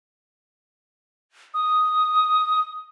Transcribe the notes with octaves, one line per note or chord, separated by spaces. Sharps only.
D#6